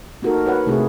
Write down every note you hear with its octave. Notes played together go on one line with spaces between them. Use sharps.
A#3 D#4 F#4 A4 A#4
F#4 B4 C#5 F#5
C3 A3 E4 G#4